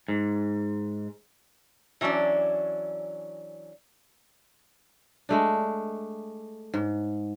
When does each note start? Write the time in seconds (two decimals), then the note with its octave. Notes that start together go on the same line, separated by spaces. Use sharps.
0.08 G#2
2.01 E3 F#3 C#4 D4 D5
5.29 G#3 A3 D4
6.74 G#2